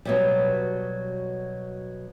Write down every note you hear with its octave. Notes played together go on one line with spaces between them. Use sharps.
B2 F#3 G3